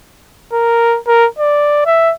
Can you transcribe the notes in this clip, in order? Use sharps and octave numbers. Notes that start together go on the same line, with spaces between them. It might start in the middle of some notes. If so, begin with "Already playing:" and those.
A#4
A#4
D5
E5